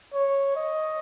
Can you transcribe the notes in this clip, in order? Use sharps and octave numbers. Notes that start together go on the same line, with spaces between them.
C#5
D#5